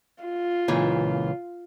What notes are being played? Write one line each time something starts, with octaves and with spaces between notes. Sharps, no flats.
F4
C#2 A#2 E3